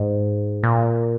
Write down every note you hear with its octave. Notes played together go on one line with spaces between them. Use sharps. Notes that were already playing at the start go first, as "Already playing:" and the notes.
Already playing: G#2
A#2